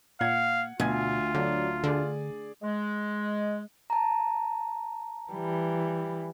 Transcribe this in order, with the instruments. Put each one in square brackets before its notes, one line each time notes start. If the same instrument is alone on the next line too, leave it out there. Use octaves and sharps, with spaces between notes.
[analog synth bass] A#2 [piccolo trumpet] F5 [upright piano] F#5 G#6
[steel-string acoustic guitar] D2 [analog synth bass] B2 [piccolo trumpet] F4 [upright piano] G#5 G#6
[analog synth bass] D3 [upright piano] F#3 D4
[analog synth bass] D3 [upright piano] G#4 D5
[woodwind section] G#3
[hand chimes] A5 A#5
[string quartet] E3 G3